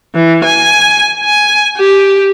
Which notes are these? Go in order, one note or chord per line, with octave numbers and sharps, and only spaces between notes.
E3
G#5
G#5
G4